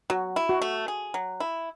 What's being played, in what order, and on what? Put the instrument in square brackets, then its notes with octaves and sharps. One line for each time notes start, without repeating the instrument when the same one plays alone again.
[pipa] F#3 [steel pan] F#4
[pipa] E4
[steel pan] F#4
[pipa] A3
G#4
F#3
E4